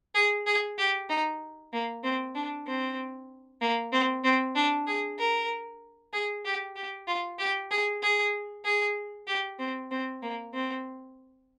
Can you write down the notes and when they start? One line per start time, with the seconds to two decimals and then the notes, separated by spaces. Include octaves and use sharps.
0.15 G#4
0.47 G#4
0.79 G4
1.09 D#4
1.73 A#3
2.04 C4
2.35 D4
2.67 C4
3.61 A#3
3.92 C4
4.24 C4
4.56 D4
4.87 G#4
5.19 A#4
6.13 G#4
6.45 G4
6.76 G4
7.08 F4
7.39 G4
7.71 G#4
8.03 G#4
8.65 G#4
9.27 G4
9.59 C4
9.91 C4
10.22 A#3
10.54 C4